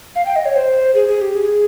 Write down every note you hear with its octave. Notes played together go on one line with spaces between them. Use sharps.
F5
G5
D#5
C#5
C5
G#4
G#4
G4
G#4